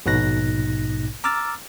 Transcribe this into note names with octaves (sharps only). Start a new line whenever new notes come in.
A#1 G#2 B2 D#4 F#6 A#6
A#5 D6 E6 F6 A6